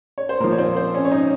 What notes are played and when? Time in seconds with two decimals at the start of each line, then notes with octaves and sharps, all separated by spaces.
0.18 C#5
0.29 C5
0.40 A#2 A#4
0.44 F3
0.52 C#5
0.58 C4 C5
0.76 C4 C5
0.94 C#4 C#5
1.05 C#5
1.12 D#4 D#5